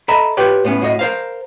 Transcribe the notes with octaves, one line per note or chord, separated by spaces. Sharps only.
A4 D#5 E5 A#5 B5
F4 G4 B4 C#5 G5
A2 B3 C#4
A2 F#4 D#5
A#4 C5 F5